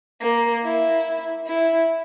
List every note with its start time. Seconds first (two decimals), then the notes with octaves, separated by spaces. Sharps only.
0.22 A#3
0.64 E4
1.47 E4